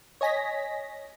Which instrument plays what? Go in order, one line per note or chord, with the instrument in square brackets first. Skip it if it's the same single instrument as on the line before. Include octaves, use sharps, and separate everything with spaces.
[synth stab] C#5 D#5 G#5 A#6 B6